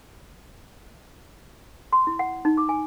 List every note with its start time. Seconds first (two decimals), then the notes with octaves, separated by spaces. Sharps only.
1.92 C6
2.07 E4
2.19 F#5
2.45 D#4
2.57 D6
2.69 G#5